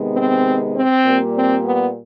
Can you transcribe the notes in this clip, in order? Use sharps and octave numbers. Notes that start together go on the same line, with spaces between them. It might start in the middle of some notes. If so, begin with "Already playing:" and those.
Already playing: C3 D#3 G#3 B3
C4
C4
A#2 G3 A#3
C4
B3